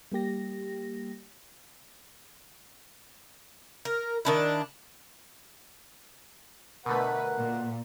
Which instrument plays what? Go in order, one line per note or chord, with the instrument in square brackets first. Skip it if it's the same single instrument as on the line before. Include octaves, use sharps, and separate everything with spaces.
[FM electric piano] G3 A#3 G4 A#6
[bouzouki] A#4
D#3 D4 E4
[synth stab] B2 D3 A3 [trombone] A#4 [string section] B4 [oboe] F#5
[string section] A#2